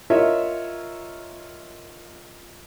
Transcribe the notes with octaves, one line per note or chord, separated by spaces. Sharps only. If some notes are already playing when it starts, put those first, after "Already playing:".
F4 A#4 C#5 D#5 E5